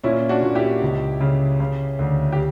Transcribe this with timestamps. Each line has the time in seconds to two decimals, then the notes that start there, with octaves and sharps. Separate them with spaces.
0.03 A#2 C#4 E4
0.29 D4 F#4
0.42 A#2
0.55 E4 G4
0.82 C#2
1.21 C#3
1.60 C#3
1.99 D2
2.32 G4